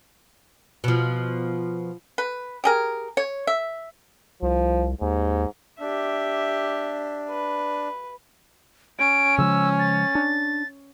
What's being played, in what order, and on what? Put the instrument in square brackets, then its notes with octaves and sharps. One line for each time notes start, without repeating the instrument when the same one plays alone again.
[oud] B2 F3
[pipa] B4
G4 G#4 A#4
C#5
E5
[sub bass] C2 [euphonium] F3
[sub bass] D#2 [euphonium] G#2
[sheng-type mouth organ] D4 [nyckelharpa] G4 E5
[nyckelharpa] B4
[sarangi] C#4 [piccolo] D7
[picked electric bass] C#3 F3 G#3 [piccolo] E6
[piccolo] A6
[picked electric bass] D4